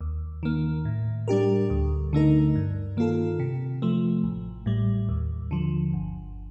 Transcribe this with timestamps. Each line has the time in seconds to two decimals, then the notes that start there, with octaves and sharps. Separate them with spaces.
0.01 D#2
0.43 D#3 A#3
0.85 A2
1.28 G3 D4 G4 A#4
1.70 D2
2.13 D3 A3 D#4 A#4
2.55 G2
2.97 D#3 A#3 F4 A4
3.39 C3
3.82 F3 A3
4.23 A1
4.66 A2 G3
5.09 D#2
5.51 D3 F3
5.93 G1